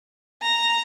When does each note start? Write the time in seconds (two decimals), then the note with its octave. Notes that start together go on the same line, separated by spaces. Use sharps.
0.43 A#5